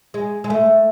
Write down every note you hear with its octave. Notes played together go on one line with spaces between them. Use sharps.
G#3
G#3
A3